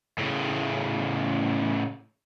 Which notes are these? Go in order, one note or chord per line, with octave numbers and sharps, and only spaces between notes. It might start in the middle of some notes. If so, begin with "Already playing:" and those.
A2 C#3